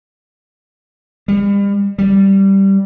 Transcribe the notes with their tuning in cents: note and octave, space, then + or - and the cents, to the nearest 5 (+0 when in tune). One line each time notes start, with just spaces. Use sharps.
G3 +40
G3 -5